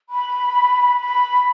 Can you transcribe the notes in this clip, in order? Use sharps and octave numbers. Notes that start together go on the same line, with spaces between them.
B5
B5